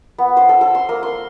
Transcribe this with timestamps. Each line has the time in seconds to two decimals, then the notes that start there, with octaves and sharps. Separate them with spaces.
0.18 B3
0.37 C5
0.49 A4
0.61 A4
0.75 C6
0.89 A#3
1.03 C6